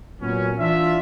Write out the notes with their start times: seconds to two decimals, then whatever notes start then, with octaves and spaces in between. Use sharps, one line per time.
0.21 A#2 F#3 B3 C#4
0.58 E3 D4 F4 E5